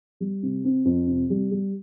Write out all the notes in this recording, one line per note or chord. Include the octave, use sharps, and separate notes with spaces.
G3
C3
C4
F2
C3
G3
G3